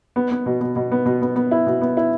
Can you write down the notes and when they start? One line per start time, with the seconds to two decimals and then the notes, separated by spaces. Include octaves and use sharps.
0.16 B3
0.31 B3
0.46 B2
0.61 B2
0.76 B2
0.92 B3
1.06 B2
1.22 B3
1.36 B3
1.51 E4
1.67 B2
1.81 B3
1.97 E4